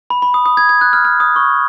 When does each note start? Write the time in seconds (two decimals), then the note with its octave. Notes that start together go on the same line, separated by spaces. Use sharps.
0.10 B5
0.22 B5
0.34 D#6
0.46 D#6
0.57 G#6
0.69 G#6
0.81 F#6
0.93 F6
1.05 F6
1.20 D#6
1.36 C#6